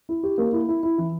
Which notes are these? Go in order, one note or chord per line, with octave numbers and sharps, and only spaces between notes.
E4
G4
A#3
E4
E4
E4
E3